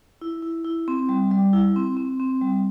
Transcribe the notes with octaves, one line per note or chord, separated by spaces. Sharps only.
E4
E4
E4
C4
G3
G3
E4
C4
C4
C4
G3